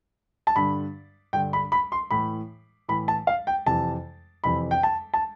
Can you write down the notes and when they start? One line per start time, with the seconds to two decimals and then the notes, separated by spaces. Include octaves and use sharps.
0.47 A5
0.56 G2 D3 B5
1.33 G2 D3 G5
1.53 B5
1.72 B5
1.92 C6
2.11 A2 E3 B5
2.88 A2 E3 B5
3.08 A5
3.27 F5
3.47 G5
3.66 F2 C3 E3 A5
4.44 F2 C3 E3 B5
4.71 G5
4.83 A5
5.14 A5